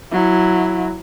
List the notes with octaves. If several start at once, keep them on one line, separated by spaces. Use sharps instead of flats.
F#3 E4